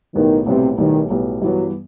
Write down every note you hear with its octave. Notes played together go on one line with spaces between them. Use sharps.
B1 A2 D#3 G3 B3
B1 A2 C3 G3 B3
B1 A2 D#3 G3 B3
B1 A2 G3 B3
G2 E3 F#3 B3